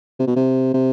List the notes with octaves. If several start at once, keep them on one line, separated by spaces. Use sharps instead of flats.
C3
B2
C3
C3